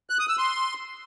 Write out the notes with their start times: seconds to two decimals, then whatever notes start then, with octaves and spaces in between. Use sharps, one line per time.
0.10 F#6
0.19 D#6
0.29 E6
0.38 C6